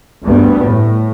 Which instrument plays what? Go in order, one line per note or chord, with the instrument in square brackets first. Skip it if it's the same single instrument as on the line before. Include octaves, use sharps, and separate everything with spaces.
[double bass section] D2 G2 G3 B3
A2